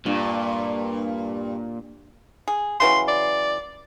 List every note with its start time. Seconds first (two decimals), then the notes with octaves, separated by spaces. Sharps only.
0.06 G2 A#2
2.48 G#4
2.80 C#3 E3 F#3 C6
3.08 D5